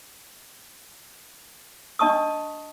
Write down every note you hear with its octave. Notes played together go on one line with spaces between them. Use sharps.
D4 D#5 A5 C#6 D#6